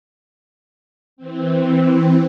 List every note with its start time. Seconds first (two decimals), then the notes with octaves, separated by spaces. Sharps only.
1.17 E3 C4